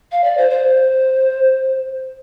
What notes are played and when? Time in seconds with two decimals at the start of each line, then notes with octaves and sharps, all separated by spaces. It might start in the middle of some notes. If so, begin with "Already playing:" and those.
0.12 F5
0.24 D5
0.37 C5
0.50 C5